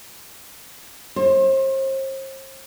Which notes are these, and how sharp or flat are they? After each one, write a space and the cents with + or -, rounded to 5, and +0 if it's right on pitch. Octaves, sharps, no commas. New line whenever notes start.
C5 +40